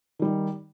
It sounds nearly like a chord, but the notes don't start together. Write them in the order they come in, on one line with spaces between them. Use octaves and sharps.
D#3 G3 D#4